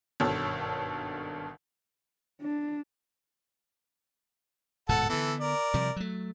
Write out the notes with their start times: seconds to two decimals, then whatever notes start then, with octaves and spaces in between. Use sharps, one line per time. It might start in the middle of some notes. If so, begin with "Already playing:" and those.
0.20 G#1 G2 B2 A4 C#5 E6
2.42 D4
4.89 D1 G#2 B2 A4 F#5 A5
5.09 D3 E3 B3 A4
5.40 A#4 D5
5.74 C3 F3 G3
5.96 F#3 A3